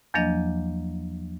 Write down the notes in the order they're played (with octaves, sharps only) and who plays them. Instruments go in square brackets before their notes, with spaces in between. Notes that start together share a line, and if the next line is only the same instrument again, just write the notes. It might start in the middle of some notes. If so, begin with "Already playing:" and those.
[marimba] E2 F3 F#3 A#3 D4 D#5